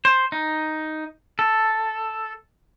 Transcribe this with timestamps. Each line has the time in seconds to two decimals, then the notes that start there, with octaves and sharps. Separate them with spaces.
0.05 C5
0.32 D#4
1.39 A4